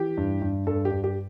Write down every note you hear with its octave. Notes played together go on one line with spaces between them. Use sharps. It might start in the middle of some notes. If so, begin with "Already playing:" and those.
Already playing: E3 G4
G2
G2
G2 A4
G4
G2
G4